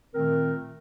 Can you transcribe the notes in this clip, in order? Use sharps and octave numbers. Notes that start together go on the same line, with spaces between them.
A#2 D#3 A3 C4 A#4